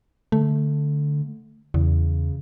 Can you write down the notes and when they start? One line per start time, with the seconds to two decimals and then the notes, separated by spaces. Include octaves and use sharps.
0.32 D3 A3
1.74 E2 C#3